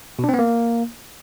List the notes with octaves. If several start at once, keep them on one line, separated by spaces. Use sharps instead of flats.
B2
D4
C4
B3
A#3